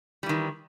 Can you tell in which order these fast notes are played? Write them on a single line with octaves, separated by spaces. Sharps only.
G3 E3 D#3